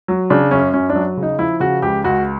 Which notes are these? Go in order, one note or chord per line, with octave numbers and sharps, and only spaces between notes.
F#3
C#3 D4
F#2 C#4
F#2 C#4
D4
F#3
C#3
D#4
F3 E4
C#3 F#4
C#2 G4
C#2 F#4